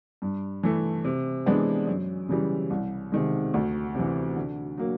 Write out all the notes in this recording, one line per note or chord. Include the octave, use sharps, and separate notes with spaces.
G2
E3 A3
C3
E3 G#3 B3 D4
F#2
C#3 E3 G3
C2
C3 D#3 G#3
D2
C3 E3
D3
F#3 A#3